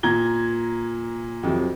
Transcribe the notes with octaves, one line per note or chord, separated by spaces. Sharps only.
A#2 A#5 G#6 G7
F2 C3 F3 F#3